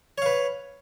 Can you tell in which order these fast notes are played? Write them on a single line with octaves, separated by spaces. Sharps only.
C#5 F5 B4